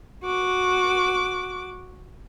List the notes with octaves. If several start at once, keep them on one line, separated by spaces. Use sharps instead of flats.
F#4 D6